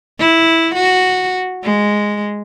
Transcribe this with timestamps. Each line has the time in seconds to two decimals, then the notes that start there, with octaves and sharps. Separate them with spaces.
0.20 E4
0.75 F#4
1.64 G#3